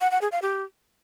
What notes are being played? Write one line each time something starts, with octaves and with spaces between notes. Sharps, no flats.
F#5
F#5
G#4
F5
G4